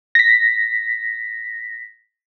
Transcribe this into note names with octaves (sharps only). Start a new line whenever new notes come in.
A#6 B6